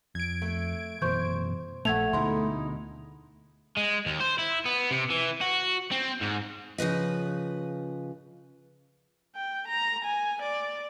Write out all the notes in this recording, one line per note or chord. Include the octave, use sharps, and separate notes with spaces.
F2 G#6 D7
A3
F#2 B2 E3 C5 C#6 G6
A#1 A3 F#5 G#6 F7
D2 B2 G#3 D#4 E4 C6
G#3
D#2
C5
E4
B3
C3
E3
F#4
C4
G#2
C#3 F3 B4 D#5
G5
A#5
G#5
D5